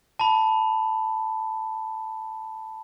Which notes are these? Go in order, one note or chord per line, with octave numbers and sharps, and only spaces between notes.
A5 B5